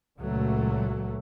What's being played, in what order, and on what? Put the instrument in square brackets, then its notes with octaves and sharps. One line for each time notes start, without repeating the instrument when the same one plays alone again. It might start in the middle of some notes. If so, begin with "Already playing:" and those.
[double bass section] C#2 A#2 F#3 A3